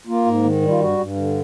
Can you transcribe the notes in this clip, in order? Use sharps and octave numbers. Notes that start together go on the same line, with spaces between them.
A#3 F4
G#2
D#3
G3
F4
G2 F#4
G2
D3